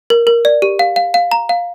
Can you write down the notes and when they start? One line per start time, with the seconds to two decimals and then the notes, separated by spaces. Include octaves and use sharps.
0.10 A#4
0.27 A#4
0.45 D5
0.62 G4
0.79 F5
0.96 F5
1.14 F5
1.31 A#5
1.49 F5